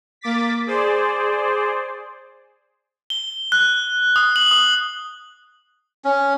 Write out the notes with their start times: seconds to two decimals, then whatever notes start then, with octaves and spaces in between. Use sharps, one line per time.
0.21 A#3 D6 A6 B6
0.67 G#4 C5 D5
3.10 G7
3.52 F#6
4.16 D#6
4.36 F#7
4.51 D#6
6.05 C#4